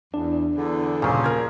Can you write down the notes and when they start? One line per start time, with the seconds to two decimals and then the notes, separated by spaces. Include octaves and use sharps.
0.14 E2 D4
0.55 E2 D3
1.02 D#1 A#2 C#3 F3 G#4
1.24 A#4 G#6